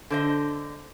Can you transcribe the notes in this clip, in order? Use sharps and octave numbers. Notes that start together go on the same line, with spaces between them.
D3 C5 D#5